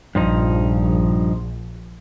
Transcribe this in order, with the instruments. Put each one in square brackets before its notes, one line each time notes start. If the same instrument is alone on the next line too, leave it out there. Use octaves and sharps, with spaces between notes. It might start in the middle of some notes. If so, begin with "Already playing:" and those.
[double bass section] A#1 [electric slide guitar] G2 F3 D#4